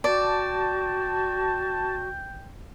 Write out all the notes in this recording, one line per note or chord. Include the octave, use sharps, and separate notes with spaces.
F#4 D5 G5 A5